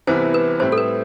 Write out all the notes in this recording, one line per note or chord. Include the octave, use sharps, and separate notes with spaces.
C2 C3 E3 B3 E4 C5
B4
A2 G3 C4 E4 C5
A4
B4